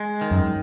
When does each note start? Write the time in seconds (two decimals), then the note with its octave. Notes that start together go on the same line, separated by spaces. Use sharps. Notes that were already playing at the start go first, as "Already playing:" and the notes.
Already playing: G#3
0.21 D#3
0.31 F#2